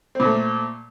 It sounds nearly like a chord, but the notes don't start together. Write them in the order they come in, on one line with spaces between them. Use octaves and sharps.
C4 A#2 A3